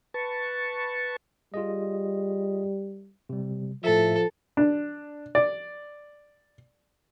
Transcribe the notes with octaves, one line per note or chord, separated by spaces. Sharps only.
B4 A5 C#6
G3 F4 G#4 D#5
C3 G3
A2 F3 A4 E5
D4
D5